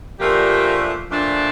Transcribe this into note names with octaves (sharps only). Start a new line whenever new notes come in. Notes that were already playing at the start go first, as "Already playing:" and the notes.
A#2 F3 A3 D4 G4 A#4
A#2 F3 A3 D4